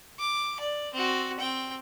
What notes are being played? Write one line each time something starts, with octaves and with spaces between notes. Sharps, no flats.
D6
D5
C4 F#4
C4 G5